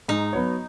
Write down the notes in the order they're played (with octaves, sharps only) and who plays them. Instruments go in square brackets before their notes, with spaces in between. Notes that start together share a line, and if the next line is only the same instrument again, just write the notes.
[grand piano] G#2 [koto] D#4
[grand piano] F#3 B3 F#4 C#5